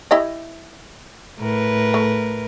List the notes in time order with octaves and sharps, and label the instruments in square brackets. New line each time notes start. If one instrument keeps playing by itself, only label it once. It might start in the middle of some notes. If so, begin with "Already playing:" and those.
[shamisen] E4 G4 D#5
[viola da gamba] A2 A#4 B4
[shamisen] A3